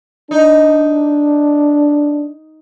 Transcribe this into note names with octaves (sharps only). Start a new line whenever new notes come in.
D4 D#4